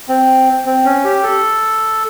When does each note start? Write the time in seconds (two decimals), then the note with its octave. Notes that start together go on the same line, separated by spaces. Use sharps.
0.09 C4
0.66 C4
0.85 C#4
1.04 G4
1.23 A4